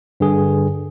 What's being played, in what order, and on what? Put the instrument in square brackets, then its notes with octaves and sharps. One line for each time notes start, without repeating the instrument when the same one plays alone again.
[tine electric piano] G2 D3 G#4